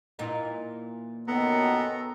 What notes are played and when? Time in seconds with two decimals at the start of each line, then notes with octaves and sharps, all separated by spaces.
0.19 A#2 E3 D#4
1.28 F#2 D#3 B3 A4 A#5